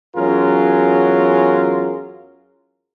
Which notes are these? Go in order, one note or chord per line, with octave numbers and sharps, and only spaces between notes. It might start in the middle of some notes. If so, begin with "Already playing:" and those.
E2 F#3 C#4 F4 G#4 A#4